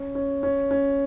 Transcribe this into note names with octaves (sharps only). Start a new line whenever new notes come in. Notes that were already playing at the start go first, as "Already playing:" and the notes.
Already playing: C#4
C#4
C#4
C#4